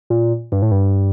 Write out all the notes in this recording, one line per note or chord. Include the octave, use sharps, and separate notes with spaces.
A#2
G2
A2
G2